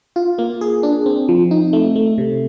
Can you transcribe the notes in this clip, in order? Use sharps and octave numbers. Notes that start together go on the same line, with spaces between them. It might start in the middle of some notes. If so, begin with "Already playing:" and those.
F4
A#3
G#4
D4
C4
F3
D#4
A3
A3
C3